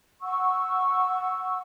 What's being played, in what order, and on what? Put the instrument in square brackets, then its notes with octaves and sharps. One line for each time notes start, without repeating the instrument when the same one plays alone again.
[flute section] F#5 C#6 E6